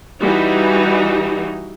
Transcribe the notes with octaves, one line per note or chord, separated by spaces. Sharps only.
E3 G3 D#4 F#4